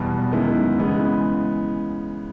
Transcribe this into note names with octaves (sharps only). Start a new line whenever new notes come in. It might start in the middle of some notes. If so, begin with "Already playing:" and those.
Already playing: E2 B2 G3 B3
F#2 D#3 G#3 B3 E4
C#3 E3 G#3 B3